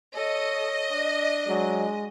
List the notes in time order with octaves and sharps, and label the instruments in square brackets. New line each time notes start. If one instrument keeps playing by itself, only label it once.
[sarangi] A4 [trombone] C#5 [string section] D#5
[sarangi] D4
[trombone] F#3 [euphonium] G#3